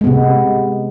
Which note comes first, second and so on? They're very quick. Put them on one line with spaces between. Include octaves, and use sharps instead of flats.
G#3 B3 C3